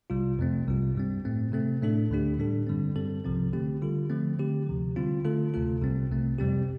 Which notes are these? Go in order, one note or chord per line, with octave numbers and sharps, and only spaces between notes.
C2 C3 G3 F4
F2 C3 A3 C4
C2 C3 G3 F4
G2 G3 C4
A2 A3 C4
C3 A3 C4 A4
A2 A3 D4 A4
D2 D3 A3 D4 G4
A2 G3 D4 A4
G2 D3 G3 C4
G2 G3 C4 A4
C2 C3 F3 C4
D3 A3 C4 G4
D3 G3 F4 A4
D3 F3 A3 C4
D3 A3 C4 G4
D2 C3 F3
D3 G3 C4 F4
D3 A3 F4 A4
D2 C3 A3 F4 A4
C2 C3 G3 C4
C2 C3 A3 C4
F2 C3 G3 C4 G4